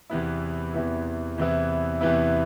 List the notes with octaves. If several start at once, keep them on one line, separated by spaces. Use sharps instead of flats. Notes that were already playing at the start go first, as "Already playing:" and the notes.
E2 C3 E3 B3 E4
E2 C3 E3 B3 E4
E2 C3 E3 B3 E4
E2 C3 E3 B3 E4